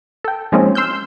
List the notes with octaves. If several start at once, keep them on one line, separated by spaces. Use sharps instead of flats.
A4 G5
F3 G#3 A#3 C4 C#4 D#4
C6 E6 F6 G6